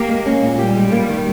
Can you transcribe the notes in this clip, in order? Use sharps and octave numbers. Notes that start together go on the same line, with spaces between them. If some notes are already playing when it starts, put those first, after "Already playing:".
Already playing: A#3 G4
G#3
C#4
A#2
G3 G4
G#3
A#3
D#3